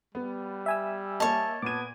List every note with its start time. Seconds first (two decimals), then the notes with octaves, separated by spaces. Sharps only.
0.15 G3 B3
0.66 E5 G#5 E6
1.20 A#3 C#5 D#5 A5
1.62 A#2 B3 D6 G#6 D#7